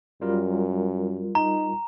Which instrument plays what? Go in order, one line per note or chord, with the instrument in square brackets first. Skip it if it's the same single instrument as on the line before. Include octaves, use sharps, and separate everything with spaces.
[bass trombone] F#2 [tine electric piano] G3 F4 A#4
[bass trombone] D#4 [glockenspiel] A#5